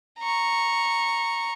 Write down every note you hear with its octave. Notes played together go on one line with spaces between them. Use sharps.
A#5 C#6